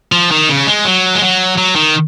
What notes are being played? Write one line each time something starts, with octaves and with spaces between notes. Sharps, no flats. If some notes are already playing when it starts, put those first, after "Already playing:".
F3
D#3
C#3
G#3
F#3
G#3
F#3
F#3
D#3